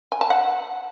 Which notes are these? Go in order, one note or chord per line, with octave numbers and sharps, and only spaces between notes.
G#5
A5
F#5